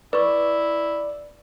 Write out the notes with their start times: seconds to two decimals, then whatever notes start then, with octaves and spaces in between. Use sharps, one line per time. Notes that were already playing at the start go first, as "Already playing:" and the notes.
0.13 E4 B4 D5 C#6